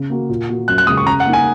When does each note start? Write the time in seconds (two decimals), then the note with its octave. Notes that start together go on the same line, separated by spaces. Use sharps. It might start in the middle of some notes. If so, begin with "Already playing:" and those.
Already playing: C#3
0.10 A#3 F#4
0.29 A#2
0.49 A#3 F#4
0.68 F#2 F#6
0.78 F#6
0.87 C#3 G#3 D#6
0.97 C#6
1.06 C#3 A#5
1.20 F#5
1.26 A#3 D#4
1.33 G#5